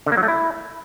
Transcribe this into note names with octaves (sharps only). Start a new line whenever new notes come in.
D3
A#3
F#3
A3
E4